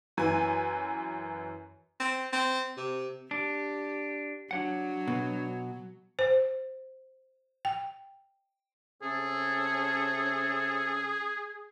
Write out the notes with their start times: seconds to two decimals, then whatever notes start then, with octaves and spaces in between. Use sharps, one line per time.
0.17 F#2 E3 G#5
2.00 C4
2.33 C4
2.77 C3
3.31 D4 G4
4.51 F#3 D4 C#5 F#5
5.08 B2
6.19 C5
7.65 G5
9.02 C3 C4 C#4 G#4 A4